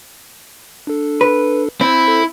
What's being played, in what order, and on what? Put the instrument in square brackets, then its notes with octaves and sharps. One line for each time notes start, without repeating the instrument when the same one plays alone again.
[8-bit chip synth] D4 A4
[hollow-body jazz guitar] B4
[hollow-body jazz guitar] C4 [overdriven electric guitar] E4
[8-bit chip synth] A4